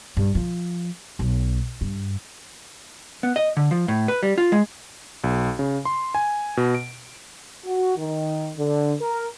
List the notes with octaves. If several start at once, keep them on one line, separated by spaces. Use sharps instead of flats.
G2
F3
B1
G2
B3
D#5
D3
F3
A2
B4
G3
F4
G#3
B1
C#3
C6
G#5
B2
D7
F#4
D#3
D3
A#4